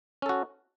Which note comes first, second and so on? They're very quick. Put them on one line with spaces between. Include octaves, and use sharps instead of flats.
C#4 A4 F#4